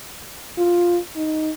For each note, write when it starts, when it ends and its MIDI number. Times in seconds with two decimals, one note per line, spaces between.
0.58 0.98 65
1.16 1.51 63